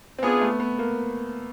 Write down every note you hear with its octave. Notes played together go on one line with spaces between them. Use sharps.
C4
B3 D4 F4 G#4
A3
B3
A#3